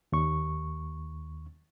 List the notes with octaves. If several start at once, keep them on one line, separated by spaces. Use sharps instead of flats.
D#2 C#6